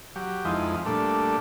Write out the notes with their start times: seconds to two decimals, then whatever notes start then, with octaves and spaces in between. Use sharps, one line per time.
0.16 F#3 G4
0.45 F2 F3 G#3 D#4 E4
0.86 A#2 G3 A3 D4 A4